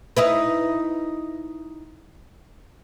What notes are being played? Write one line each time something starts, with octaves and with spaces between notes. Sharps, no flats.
D#4 E4 B4